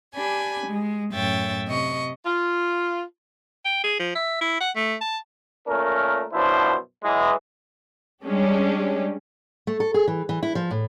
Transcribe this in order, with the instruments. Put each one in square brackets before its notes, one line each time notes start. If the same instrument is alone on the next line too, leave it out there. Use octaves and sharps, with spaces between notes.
[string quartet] D4 G4 G#5 B5
G#3
F#2 A2 C#5 E5 G5 A6
C3 D#5 C#6
[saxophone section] F4
[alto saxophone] G5
G#4
F3
E5
E4
F#5
A3
A5
[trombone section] A#2 A3 C#4 A#4
F#2 B2 F3 D4 E4 C5
E3 F#3 G#3
[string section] G3 G#3 C#4 D4 G4
[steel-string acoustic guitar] A3
A4
G#4
E3
E3
E4
F3
A2